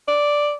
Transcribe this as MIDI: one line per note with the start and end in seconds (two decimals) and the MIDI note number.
0.08 0.55 74